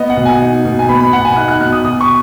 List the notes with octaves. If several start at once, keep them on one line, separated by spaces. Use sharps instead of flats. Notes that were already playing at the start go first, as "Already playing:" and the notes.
Already playing: B3 D#5
F#5
B2
G#5
D#4
B2
G#5
B3 B5
B5
B2 F#5
G#5
D#4 F#6
F#6
B2 F#6
D#6
B2 D#6
C#6